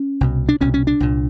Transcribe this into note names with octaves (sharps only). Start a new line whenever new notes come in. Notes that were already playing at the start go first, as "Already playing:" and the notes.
Already playing: C#4
C2 B2
D4
C2 B2 C#4
C#4
D4
C2 A#2